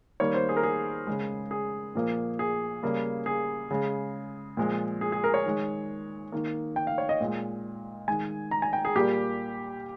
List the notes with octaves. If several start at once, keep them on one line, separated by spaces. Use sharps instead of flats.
D#3 G3 A#3 C#5
C5
G#4
A#4
G#4
C#3 G#3
G#4
A#2 F3 A#3
G#4
C#3 G3 A#3
G#4
C#3 G#3
A#2 F3 G#3
G#4
G#4
A#4
C#5
D#3 G#3
D#3 A#3
G5
F5
C#5
D#5
A#2 G#3
D#3 G#3 G#5
A#5
G#5
G5
G#4
A#2 G3 A#3 G4